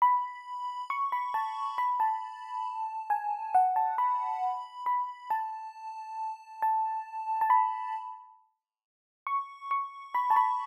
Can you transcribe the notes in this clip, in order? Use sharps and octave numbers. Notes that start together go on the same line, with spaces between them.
B5
C#6
B5
A5
B5
A5
G#5
F#5
A5
B5
B5
A5
A5
A5
B5
C#6
C#6
B5
A5
B5